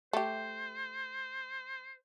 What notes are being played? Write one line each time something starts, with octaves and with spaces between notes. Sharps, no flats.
A3 G4 C5